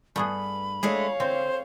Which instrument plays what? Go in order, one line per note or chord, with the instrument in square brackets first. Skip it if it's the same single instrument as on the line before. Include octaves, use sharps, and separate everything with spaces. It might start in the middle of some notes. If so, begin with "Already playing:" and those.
[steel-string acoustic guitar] G2 [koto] A3 B3 G#4 [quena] B5
[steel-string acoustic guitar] G#3 A3 D4 [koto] G#4 [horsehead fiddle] C#5 F5
[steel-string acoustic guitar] D3 [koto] C4 [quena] C5